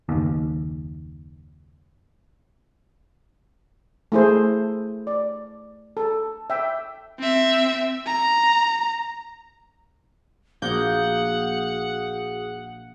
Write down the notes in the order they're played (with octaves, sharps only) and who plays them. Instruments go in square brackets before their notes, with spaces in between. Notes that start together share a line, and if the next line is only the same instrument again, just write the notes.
[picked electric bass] F#1 D#2
[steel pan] A3 E4 G#4 C5
D5
A4
E5 G5
[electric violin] C4 E5
A#5
[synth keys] A#1 G6 [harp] A#3 [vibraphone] F#4 G#4 D#6 [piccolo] F#5